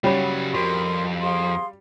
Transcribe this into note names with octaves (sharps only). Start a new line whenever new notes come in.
C#3 F#3 G3 C#4 C#5 B5
F2 F#4 A#4 C6 C#6
G#4 F5 C6